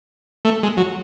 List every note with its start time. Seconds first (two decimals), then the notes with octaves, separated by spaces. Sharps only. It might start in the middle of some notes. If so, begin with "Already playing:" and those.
0.45 A3
0.63 G#3
0.77 F#3